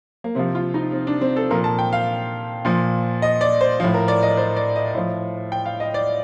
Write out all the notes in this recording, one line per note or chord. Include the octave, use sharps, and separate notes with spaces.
A#3
C3 F3 C4
F4
D#4
C4
D4
C4
A4
A#2 F3 A#4
A5
G5
F5
A#2 F3
D#5
D5
C5
A2 F3
A#4
D5
D#5
C5
D5
D#5
A2 F3
G5
F5
D#5
D5